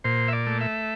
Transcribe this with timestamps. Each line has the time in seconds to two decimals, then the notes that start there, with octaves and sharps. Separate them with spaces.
0.04 A#2 C5
0.28 E5
0.33 D5
0.47 A3
0.61 E5